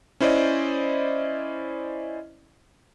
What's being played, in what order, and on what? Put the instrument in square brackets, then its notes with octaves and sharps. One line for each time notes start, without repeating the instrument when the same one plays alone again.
[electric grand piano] C#4 E4 C5 D5 D#5